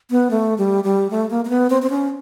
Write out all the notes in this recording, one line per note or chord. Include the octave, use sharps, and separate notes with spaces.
B3
A3
G3
G3
A3
A#3
A#3
B3
C4
C4
C#4